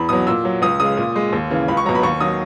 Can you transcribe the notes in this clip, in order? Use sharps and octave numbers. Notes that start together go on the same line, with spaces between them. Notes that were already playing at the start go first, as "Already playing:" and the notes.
Already playing: E2 B5
B2 F#3 D#6
A#2 E6
F#3
C#2 D#6
C#3 G#3 D#6
A#2
G#3
D#2
C#3 E3
C#2 B5
C#6
B2 F#3 A#5
B5
D#2 C#6
D#3 F#3 D#6